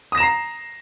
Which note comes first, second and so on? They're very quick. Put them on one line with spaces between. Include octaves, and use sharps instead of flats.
D#6 A#6 E7 A#5 C7